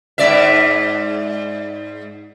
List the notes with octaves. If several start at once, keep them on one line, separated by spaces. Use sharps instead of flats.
G#2 D5 E5